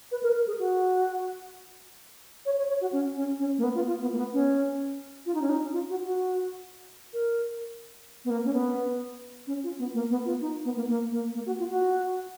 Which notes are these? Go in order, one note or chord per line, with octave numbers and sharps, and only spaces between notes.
B4
A#4
A#4
G#4
F#4
C#5
C#5
C#5
F#4
C#4
C#4
C#4
A#3
B3
F4
F4
B3
A#3
B3
C#4
F4
D#4
C#4
D#4
F4
F#4
F#4
A#4
B3
A#3
C#4
B3
C#4
F4
B3
A#3
B3
F4
D#4
B3
A#3
A#3
A#3
A#3
F#4
F4
F#4